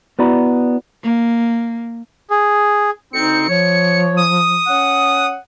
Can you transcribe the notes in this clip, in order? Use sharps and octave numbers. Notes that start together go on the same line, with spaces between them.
B3 E4 F#4 D5 A#5 B5
A#3
G#4
D2 C#3 C4 D#4 C#7
F3 C#5
D#6
C#4 F#5